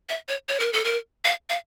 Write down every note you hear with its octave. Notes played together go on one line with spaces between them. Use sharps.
E5
C#5
C#5
A#4
A4
A#4
F5
F5